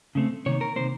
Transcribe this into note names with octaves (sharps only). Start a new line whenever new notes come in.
C#3 A3 C4
C3 D#3 A#3 C#5
A#4
C3 D#3 A#3 C5